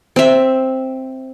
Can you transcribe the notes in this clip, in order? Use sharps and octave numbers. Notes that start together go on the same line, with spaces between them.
C4 E5